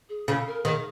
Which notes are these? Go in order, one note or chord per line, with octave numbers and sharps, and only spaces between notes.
G#4
C#3 A4
A#4
D#3 G#4